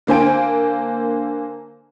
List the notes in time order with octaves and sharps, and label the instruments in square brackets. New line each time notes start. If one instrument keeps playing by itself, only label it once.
[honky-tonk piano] D3 A#3 C5 G#5 D7